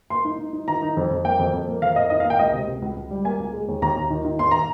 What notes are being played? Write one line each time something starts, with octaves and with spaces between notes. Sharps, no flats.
A#3 C6
D#4
D#4
D#4
D#3 A#5
D#4
F2
F2
A#3 G5
F2
F2
A#3
F2 F5
A#3 D#5
D#3 D#5
F5
A#3
G5
C#2 D#5
C3
C#2
C#2
C#2
G3
A#3 G#5
C#2
G#3
D#2
D#2 A#5
D#2
D#3
D#3
D#2 C6
A#5